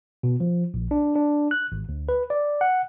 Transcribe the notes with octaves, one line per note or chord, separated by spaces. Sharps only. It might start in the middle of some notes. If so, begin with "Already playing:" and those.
B2
F3
A#1
D4
D4
F#6
G#1
D2
B4
D5
F#5